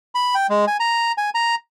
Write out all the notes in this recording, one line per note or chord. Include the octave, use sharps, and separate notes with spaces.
B5
G5
G#3
G#5
A#5
G#5
A#5